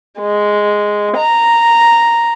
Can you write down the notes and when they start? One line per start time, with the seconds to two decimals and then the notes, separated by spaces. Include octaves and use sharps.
0.19 G#3
1.17 A#5